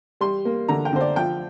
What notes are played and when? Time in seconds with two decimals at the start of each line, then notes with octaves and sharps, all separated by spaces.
0.21 G3 C6
0.45 A#3
0.68 D3 A#5
0.85 G5
0.93 D3 C5
1.01 D5
1.16 F3 G5